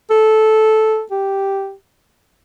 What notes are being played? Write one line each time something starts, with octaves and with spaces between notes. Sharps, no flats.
A4
G4